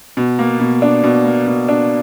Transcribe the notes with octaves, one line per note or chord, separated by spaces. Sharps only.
B2
A#3
B2
D4
B2
A#3
B2
D4